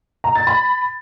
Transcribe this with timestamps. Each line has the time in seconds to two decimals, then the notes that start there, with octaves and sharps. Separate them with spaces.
0.24 A#5
0.36 A6
0.47 B5